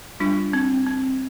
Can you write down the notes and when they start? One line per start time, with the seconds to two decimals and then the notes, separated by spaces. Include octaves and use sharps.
0.20 G3 D4 F4
0.53 C4
0.87 C4